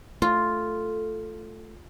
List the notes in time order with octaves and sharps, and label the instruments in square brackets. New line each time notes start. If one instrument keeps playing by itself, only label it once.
[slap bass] A3 [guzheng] F4